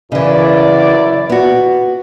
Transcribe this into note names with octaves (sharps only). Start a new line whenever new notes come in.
F#2 C#3 E3 E4 D5
B3 F#4